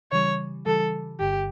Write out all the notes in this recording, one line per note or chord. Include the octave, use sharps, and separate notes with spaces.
C#3 E3 G3 C#5
C#3 E3 G3 A4
G1 G2 D3 G4